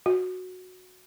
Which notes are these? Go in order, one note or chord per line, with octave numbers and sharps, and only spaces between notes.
F#4